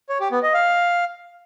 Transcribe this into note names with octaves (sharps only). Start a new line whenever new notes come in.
C#5
G4
B3
D#5
F5